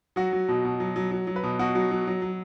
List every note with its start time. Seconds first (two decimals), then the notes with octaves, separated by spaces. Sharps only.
0.16 F#3 F#4
0.32 F#3
0.49 B2
0.65 B2
0.80 F#3
0.96 F#3
1.11 F#3
1.27 F#3
1.36 B4
1.43 B2
1.59 B2 F#4
1.75 F#3
1.91 F#3
2.07 F#3
2.22 F#3